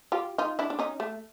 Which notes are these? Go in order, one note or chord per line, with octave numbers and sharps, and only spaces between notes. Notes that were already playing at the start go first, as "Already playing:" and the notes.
F4 G4
D#4 F4
D4 E4
D4
C#4 D#4
A3